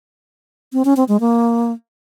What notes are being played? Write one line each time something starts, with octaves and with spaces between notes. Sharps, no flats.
C4
C#4
C4
G#3
A#3